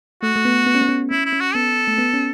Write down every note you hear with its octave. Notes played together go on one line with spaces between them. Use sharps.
A3 F#4
A3
B3
B3
C#4
B3
C#4
C#4 E4
E4
C#4
F#4
B3 A4
A3
B3
C#4